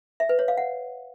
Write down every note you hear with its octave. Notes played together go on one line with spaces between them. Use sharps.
E5
B4
C#5
F5
F#5